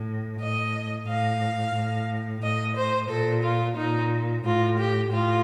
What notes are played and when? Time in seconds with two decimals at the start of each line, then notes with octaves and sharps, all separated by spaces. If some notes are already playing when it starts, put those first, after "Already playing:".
Already playing: A2
0.39 A2 D#5
1.07 A2 F5
1.75 A2
2.42 A2 D#5
2.76 C5
3.09 A#2 A4
3.42 F4
3.76 A#2 D#4
4.44 A2 F4
4.78 G4
5.11 A2 F4